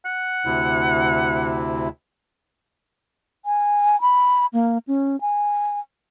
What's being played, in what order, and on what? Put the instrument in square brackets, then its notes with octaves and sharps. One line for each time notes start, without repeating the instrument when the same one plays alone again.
[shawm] F#5
[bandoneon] D2 C3 E4
[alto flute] G#5
B5
A#3
C#4
G#5